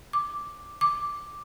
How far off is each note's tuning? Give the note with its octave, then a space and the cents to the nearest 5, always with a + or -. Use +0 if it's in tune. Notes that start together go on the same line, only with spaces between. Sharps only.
D6 +0
D6 +0